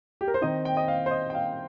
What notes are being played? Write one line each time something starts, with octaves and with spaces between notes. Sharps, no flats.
G4
A#4
C5
D#3 C4 D#4 D#5
G5
D#5
F5
C5
D#5
G5
F5